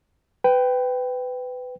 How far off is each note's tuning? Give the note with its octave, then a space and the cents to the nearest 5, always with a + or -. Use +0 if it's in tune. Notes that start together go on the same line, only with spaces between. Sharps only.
B4 +20 G5 +0